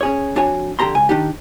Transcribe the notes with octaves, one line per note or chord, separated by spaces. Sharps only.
C#4 G#4 C#5
F2 D4 F#4 C#5 G#5
F2 D3 G4 A#5 C6
C#2 G#5
D#3 D4 D#4 G4